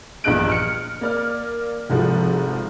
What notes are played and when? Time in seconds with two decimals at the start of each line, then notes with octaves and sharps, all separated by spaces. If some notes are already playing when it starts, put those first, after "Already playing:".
0.24 A#1 E2 G2 D#5 F#6 D7
0.49 F6 C#7
1.01 A#3 D5 F6
1.90 F1 C2 G#2 F3 F#4